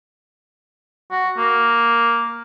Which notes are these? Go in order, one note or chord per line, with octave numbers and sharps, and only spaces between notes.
F#4
A#3